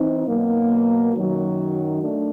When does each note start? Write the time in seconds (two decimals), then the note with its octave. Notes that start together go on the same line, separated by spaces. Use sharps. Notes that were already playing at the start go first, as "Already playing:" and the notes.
Already playing: E3 C4 D#4
0.25 B2 F#3 A#3
1.13 F#2 D#3 F#3
2.02 A3 D4